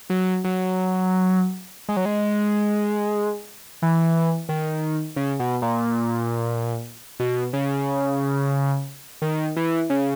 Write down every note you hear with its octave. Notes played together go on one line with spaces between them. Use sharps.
F#3
F#3
G#3
F#3
G#3
E3
D#3
C#3
B2
A#2
B2
C#3
D#3
E3
C#3